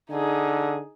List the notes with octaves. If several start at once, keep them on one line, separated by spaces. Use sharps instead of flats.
D3 D#4 G#4